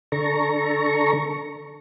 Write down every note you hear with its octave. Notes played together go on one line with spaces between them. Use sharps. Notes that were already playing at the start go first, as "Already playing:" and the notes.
D3 A4 A#5 C#6